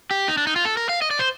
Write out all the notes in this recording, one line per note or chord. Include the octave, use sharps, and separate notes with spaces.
G4
D#4
D4
D#4
F4
A4
A#4
F5
D#5
D5
C5